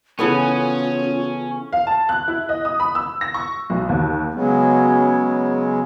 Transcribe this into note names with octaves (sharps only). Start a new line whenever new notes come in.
C#3 E3 B3 C#4 F4 A4
F5
A5
F#6
E4
D#5
D#6
B5
E6
A#6
C#6
B1
D#2
C#3 F#3 G#3 B3 C#4